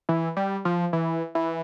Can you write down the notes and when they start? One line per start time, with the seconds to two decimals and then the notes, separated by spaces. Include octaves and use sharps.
0.09 E3
0.37 G3
0.65 F3
0.93 E3
1.35 E3